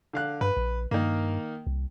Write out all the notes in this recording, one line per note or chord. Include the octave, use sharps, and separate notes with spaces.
D3 F5 F#6
G2 B4
A#1
G2 D#3 A#3
C2